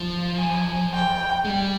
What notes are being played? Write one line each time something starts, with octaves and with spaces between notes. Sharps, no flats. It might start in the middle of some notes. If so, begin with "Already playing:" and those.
Already playing: F3
G#5
G5
G#3
G3